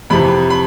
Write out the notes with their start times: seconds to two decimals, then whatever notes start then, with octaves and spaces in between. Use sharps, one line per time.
0.10 F2 C3 E3 B5
0.50 B5